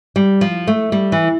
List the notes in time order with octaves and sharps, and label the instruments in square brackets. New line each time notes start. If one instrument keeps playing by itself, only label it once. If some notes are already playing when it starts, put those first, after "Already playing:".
[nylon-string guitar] G3
F3
A3
G3
E3